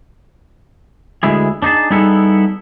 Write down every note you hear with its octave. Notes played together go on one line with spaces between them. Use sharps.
D2 G#3 E4 G#4
D4 D#4 G#4 A5
G3 B3 D#4 E4 G#4 A4